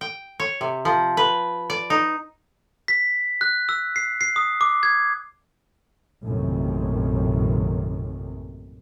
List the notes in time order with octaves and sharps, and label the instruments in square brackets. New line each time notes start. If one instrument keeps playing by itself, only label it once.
[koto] G5
C#5
C3
F3
B4
D5
D#4
[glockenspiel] B6
F#6
E6
C7
C7
D#6
D6
G#6
[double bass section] A#1 F#2 A2 C3 D#3